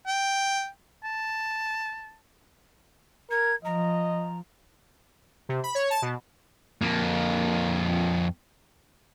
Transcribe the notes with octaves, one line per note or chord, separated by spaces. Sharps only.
G5
A5
A#4 G#6
F3 D#5 A#5
C3
B5
C#5
A5
B2
F2 A#3